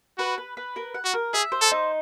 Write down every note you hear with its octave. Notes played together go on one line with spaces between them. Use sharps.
F#4 B4
B4
B4
A#4
F#5
F#4
A#4
G#4 E5
C5
A4
D#4